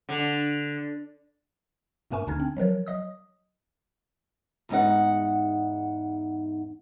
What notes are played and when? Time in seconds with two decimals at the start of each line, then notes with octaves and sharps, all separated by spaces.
0.09 D3
2.11 G2 A#2 A3 A#4 G#5 C#6
2.27 D2 D3 D4 D#4 F6 G#6
2.40 C4
2.57 F3 F#3 A#4 C#5
2.87 F#3 D#5 D#6
4.69 E2 G#2 D#4 F#5